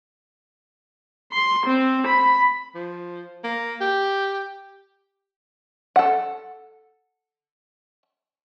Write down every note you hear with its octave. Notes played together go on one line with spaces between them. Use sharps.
C6
C4
B5
F3
A#3
G4
A4 F#5